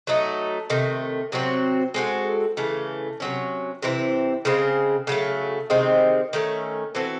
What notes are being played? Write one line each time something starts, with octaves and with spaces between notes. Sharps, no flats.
F#3 A3 D#4
C3 D#3 A3
C3 F#3 C4 F#4
G#3 C4 F#4 A4
C#3 E3 A3
C3 F#3 C#4
C3 E3 C4 E4
C#3 G#3 C4
C#3 F#3 A3
C3 D#3 G#3 C4
D#3 A3 C#4
E3 C4 F#4 A4